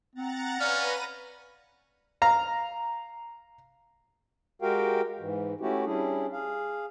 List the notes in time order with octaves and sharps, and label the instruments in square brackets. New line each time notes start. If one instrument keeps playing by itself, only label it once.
[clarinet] C4 [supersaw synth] F#5 A#5 A6
[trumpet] C#4 [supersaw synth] B4 A#6 D#7 [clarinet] D5 [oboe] F5
[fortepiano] F5 A#5
[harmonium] G#3 F#4 G4 A#4 F5 G5
G#2 E3
A3 C#4 E4 F#4 G4
G3 C#4 D4 E4 G#4
G#4 F5